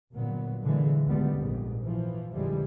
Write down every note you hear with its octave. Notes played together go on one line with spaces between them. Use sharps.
G1 A#2 F#3 B3
A#2 D3 E3 G#3
G#1 C#2 D3 G3 B3
A#1 F2 G#2
E3 F3
A#1 F2 D3 E3 G3 G#3